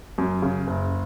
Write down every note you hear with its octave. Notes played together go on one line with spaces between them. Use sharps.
F#2
C#3
F#1